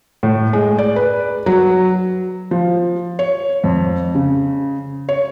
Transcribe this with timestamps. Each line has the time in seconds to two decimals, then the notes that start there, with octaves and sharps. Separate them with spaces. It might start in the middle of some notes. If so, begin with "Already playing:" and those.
0.23 A2
0.53 G#3
0.78 D5
0.96 B4
1.46 F#3
2.51 F3
3.19 C#5
3.64 F2
4.15 C#3
5.09 C#5